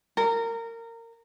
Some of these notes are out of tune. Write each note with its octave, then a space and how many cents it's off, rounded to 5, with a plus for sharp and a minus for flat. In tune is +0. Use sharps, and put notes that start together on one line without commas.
A#4 -20